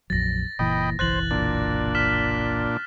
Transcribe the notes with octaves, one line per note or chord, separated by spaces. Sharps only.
A#1 F2 F#3 A6 A#6
F#1 A#2 E3 D#5 G5 B5
F#1 B1 E3 C5 F#6 A6 F#7
A#2 D4 A6
F6 B6 E7